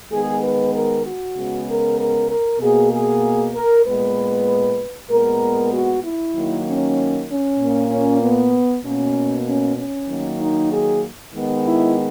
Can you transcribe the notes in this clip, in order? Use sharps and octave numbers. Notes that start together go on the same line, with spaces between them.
D#3 G#3 B3 G#4
B4
A#4
F#4
C#3 G#3 B3
A#4
A#4
A#4
B2 A#3 G#4
G#4
A#4
A#2 G#3 B3 B4
A#2 G#3 B3 A#4
F#4
E4
D#3 F#3 A#3
C#4
C#4
A#2 A#3
C#4
B3
B2 A#3 C#4
C#4
C#4
D#3 F#3 A#3
D#4
G#4
D#3 G#3 B3
E4